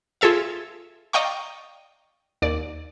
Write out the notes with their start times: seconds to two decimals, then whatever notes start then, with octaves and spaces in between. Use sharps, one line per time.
0.21 F4 G#4 A4 E5 F5
1.13 D5 D#5 F5 G5 A#5 C#6
2.42 D#2 D5